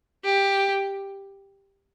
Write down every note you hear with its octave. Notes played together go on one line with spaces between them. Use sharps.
G4